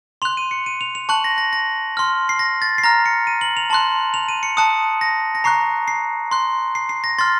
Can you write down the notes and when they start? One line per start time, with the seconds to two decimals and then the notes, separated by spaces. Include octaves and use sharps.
0.22 C6 F7
0.25 F#6
0.37 D#7
0.51 C#7
0.66 D#7
0.81 F7
0.95 F7
1.09 A5 C#6 F#6 F#7
1.24 A#6
1.38 A#6
1.53 A#6
1.97 C6 F6
2.29 C7
2.39 A#6
2.62 A6
2.78 C7
2.83 A#5 F6 A#6
3.06 C#7
3.27 D#7
3.41 F#7
3.57 F7
3.70 A5 C6 F#6 F#7
4.14 F7
4.29 D#7
4.43 C#7
4.57 A5 D#6 F#6 C#7
5.01 A#6
5.35 A#6
5.44 A#5 C#6 F#6 C7
5.88 C7
6.32 C6 F#6
6.75 C7
6.89 C7
7.04 A#6
7.18 C6 F6 A6